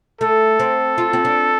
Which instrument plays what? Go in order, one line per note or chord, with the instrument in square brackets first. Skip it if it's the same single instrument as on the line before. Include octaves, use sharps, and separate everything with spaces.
[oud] A3 [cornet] A4
[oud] C4
F4
C4
D4